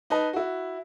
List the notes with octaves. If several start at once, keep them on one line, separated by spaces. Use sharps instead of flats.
D#4 B4 D#5 A5
E4 F#4